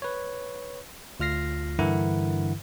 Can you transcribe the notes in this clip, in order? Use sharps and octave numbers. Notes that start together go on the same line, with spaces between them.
B4 C#5
D2 F4 F6 A#6 C7
G2 D3 E3 E4 A#4 F#5